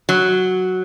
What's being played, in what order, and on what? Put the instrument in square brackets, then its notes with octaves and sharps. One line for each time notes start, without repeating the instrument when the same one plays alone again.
[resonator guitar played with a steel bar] F#3